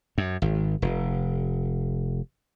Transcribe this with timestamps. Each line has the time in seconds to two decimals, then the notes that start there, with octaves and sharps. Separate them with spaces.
0.18 F#2
0.42 G#1
0.82 F1